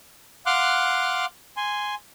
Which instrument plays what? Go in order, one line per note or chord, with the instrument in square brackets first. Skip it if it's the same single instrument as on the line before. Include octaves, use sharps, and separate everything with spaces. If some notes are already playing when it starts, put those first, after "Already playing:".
[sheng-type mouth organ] F5 F#5 C6 D6 F6 F#6
G#5 C6